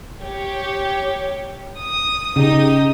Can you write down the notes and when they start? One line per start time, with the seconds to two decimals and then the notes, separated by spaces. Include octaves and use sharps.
0.21 G4 C#5
1.79 D#6
2.36 C#3 D#4 G4 D#6